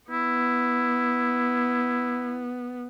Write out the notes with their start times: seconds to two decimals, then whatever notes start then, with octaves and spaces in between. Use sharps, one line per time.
0.11 B3 E4